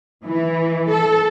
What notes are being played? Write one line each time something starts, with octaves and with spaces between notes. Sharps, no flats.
E3
A4